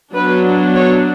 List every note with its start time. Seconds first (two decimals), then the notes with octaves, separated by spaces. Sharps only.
0.15 F#3 B3 D4 B4
0.76 C#5